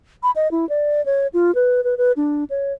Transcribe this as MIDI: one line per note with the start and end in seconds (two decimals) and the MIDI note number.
0.23 0.31 83
0.36 0.50 75
0.51 0.68 64
0.69 1.04 74
1.06 1.27 73
1.33 1.54 65
1.55 1.84 71
1.84 1.97 71
1.98 2.12 71
2.17 2.44 62
2.50 2.73 73